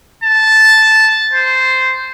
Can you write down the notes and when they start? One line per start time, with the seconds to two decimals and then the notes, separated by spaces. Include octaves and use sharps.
0.24 A5
1.33 C5